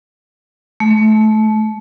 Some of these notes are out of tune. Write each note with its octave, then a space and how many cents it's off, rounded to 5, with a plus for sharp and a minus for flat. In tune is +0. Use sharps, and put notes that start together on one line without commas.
A3 -25